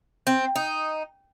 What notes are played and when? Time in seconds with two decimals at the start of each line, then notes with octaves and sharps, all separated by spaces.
0.27 C4
0.56 D#4